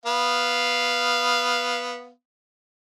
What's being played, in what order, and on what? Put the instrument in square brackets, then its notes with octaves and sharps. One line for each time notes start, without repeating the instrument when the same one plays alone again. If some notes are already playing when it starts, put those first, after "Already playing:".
[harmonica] B3 F5